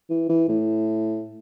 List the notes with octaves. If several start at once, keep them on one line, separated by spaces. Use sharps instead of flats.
E3
E3
A2